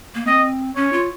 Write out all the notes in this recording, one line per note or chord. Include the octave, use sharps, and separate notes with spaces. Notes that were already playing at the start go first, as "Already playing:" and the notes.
A#3
C4 D#5
C#4 C#5
F4